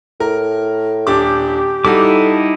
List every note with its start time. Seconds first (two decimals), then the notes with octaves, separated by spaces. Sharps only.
0.20 A2 A#4
1.07 D#1 D4 G4 D6
1.85 G3 D#4 E4 F#4 A4 D6